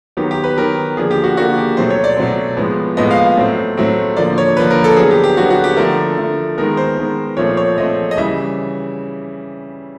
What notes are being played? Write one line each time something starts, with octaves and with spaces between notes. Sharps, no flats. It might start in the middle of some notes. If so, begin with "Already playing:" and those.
D#3 F#3 B3 G4
G4
B4
D#3 F#3 B3 A#4
D3 F3 A#3 G#4
G4
F#4
D3 F3 A#3 F#4
G4
B2 F#3 A3 C4 C5
C#5
D5
B2 F#3 A3 C4
A2 F3 G#3 B3
A2 F3 G#3 B3 D#5
F5
A2 F#3 A3 C4
A2 F#3 A3 C4
D3 F3 A#3 D5
C#5
D3 F3 A#3 B4
A#4
A4
D3 F#3 B3 G#4
G4
G4
D3 F#3 B3 F#4
F#4
G4
D3 F3 A3 A#4
D3 F3 A3
D#3 G#3 B3 A#4
C5
D#3 G#3 B3
A#2 F3 A3 C4 C#5
C#5
A#2 F3 A3 C4 D#5
D#5
C#3 E3 G3 E5